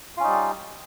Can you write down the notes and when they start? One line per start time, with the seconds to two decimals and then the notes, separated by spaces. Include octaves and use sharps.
0.17 F4
0.20 C#4
0.23 D#4
0.27 G3